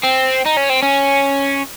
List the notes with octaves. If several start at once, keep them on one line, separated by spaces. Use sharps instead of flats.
C4
D#4
C#4
C4
C#4